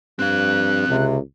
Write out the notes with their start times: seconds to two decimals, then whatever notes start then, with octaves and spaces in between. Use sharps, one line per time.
0.19 G2 C4 F5 F#6
0.88 C#2 C3